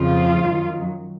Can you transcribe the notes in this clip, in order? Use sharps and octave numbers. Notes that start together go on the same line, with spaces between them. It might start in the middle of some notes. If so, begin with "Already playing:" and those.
Already playing: F2 C#3 F3 F4
F#2 D#3 F#3